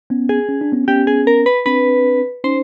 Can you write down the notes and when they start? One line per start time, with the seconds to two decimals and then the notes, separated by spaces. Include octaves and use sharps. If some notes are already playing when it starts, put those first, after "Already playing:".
0.10 B3 C#4
0.29 G#4
0.49 C#4
0.61 D4
0.72 B3 C#4
0.88 B3 C#4 G4
1.07 G#4
1.27 A#4
1.46 B4
1.66 C4 D4 B4
2.44 C#4 D#4 C5